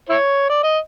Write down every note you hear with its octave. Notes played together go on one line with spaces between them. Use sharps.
E4 C#5
D5
D#5